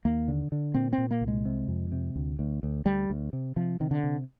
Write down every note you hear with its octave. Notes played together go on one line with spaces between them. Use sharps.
D#2 A#3
D3
D3
A#2 C4
C4
A#2
A#3
C2
G#3
C3
F2
C3
D2
D2
D2
D2 G3
D2
C3
C3 F3
C3 D#3
D3
C3